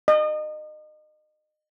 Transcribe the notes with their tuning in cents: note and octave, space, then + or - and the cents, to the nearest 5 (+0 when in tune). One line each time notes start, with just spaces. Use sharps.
D#5 -30